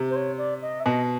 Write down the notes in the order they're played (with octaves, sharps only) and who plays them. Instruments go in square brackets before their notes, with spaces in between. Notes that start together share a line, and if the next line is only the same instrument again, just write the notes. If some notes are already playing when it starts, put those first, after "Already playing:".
Already playing: [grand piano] C3
[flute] C5
C#5
D5
D#5
E5
[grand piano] B2 [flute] D#5